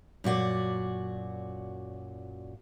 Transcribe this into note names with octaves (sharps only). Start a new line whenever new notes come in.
F#2 A#2 F#4 D5